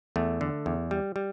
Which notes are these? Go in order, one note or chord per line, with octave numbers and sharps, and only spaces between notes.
E2 A3
D3
E2
G3
G3